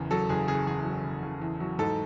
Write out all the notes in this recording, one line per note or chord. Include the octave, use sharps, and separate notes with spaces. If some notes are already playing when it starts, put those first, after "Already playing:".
Already playing: F#1 E2 C#3
F#3 A4
F#1 G#4
C#3 G#4
E2 G#4
F#3
F#1
C#3
E2
F#3
G#2 A4